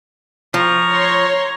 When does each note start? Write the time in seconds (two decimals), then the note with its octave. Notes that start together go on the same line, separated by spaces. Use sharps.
0.54 F3 A#5 C#6
0.90 C#5 C6